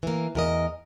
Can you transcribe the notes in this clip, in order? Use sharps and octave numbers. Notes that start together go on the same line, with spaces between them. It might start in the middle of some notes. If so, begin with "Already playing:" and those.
E3 A#3
E2 A#4 D#5